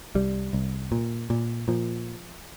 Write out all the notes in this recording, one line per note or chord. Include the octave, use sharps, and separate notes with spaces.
C2 G3
C2
A#2
A#2
A#2 F3